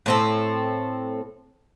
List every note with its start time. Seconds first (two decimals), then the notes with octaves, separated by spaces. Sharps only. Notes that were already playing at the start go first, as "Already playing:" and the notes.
0.06 A2 C4 A4